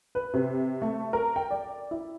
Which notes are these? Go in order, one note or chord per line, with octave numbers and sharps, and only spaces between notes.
B4
C3
A3
A#4
G5
D5
E4